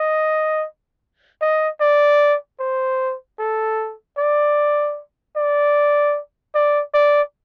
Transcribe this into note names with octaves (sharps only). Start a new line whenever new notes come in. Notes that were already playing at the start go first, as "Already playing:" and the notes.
Already playing: D#5
D#5
D5
C5
A4
D5
D5
D5
D5